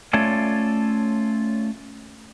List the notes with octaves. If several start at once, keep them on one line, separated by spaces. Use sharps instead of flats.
A3 C#4 F4 A4 C#5 D5